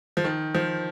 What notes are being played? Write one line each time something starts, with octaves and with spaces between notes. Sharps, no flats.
F3
D#3
F3